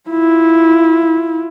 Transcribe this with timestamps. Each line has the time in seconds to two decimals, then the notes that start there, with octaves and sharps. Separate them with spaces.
0.10 E4 F4